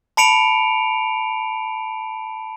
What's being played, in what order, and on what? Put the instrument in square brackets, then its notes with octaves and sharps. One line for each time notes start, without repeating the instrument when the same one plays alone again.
[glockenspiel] A5 B5 C#7 D7 F7